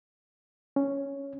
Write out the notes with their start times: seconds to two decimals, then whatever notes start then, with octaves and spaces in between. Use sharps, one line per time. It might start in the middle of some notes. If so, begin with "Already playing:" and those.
0.76 C#4